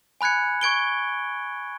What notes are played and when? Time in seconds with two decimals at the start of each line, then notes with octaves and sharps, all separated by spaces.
0.21 G#5 B5 F#6 G#6 C#7
0.61 C#6 G#6 D7 G7